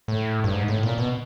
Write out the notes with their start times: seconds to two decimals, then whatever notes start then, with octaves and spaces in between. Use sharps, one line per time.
0.08 A2
0.44 G2
0.53 G#2
0.68 A2
0.83 A#2
0.98 B2